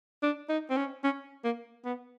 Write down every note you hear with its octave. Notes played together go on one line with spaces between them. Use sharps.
D4
D#4
C4
C#4
C#4
A#3
B3